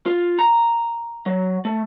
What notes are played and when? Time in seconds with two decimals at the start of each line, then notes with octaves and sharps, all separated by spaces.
0.06 F4
0.39 A#5
1.26 F#3
1.65 A3